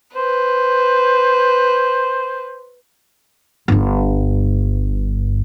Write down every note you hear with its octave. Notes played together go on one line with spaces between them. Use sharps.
B4 C5
G1 G2